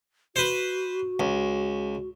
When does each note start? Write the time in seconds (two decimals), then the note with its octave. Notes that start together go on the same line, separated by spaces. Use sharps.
0.36 F#4 B4 C5
1.20 C#2